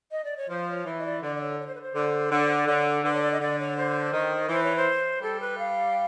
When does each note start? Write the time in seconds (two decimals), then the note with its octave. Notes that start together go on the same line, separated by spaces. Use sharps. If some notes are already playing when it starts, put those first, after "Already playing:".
0.11 D#5
0.24 D5
0.37 C#5
0.50 F3 C5
0.69 C#5
0.86 E3
0.99 D#5
1.05 D5
1.22 D3 D5
1.35 D5
1.40 C#5
1.59 C#5
1.66 C5
1.74 B4
1.81 C5
1.95 D3
2.31 D3 C#5
2.44 C5
2.56 D5
2.68 D3 C#5
3.04 D3 B4
3.13 C#5
3.22 D5
3.32 D#5
3.40 D3 D5
3.59 C#5
3.77 C5
4.13 D#3
4.49 E3 C5
4.63 C#5
4.76 C5
5.22 G3 A4
5.40 B4
5.58 F5